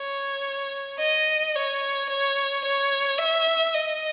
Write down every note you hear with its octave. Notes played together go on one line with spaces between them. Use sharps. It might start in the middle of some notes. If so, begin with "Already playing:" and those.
Already playing: C#5
D#5
C#5
C#5
C#5
E5
D#5